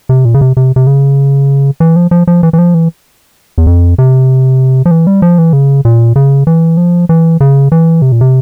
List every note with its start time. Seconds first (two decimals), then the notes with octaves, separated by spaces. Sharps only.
0.09 C3
0.25 A#2
0.34 C#3
0.41 C3
0.57 C3
0.76 C3
0.87 C#3
1.80 E3
1.96 F3
2.11 F3
2.27 F3
2.43 E3
2.53 E3
2.58 F3
2.74 E3
3.58 E2
3.67 F2
3.98 C3
4.86 F3
4.91 E3
5.07 G3
5.22 F3
5.38 E3
5.53 C#3
5.85 A#2
6.16 C#3
6.47 E3
6.77 F3
7.09 E3
7.40 C#3
7.72 E3
8.02 C3
8.12 A#2
8.21 C3